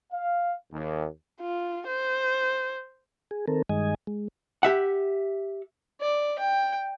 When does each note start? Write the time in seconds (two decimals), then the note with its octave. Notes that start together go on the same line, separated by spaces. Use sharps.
0.12 F5
0.73 D#2
1.41 F4
1.87 C5
3.31 G#4
3.48 D#3 C4 A4 A#4
3.69 G2 D#3 G#3 D#5 G#5
4.07 G#3
4.63 G4 E5 F#5
6.01 D5
6.39 G5